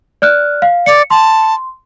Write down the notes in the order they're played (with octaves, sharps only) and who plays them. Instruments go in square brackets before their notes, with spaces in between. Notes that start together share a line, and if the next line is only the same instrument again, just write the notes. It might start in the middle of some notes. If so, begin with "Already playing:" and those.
[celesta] D5 F6 F#6
F5
[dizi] D5 [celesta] C#7
[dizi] A5 [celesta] C6